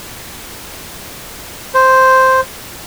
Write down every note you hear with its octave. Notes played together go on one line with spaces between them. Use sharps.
C5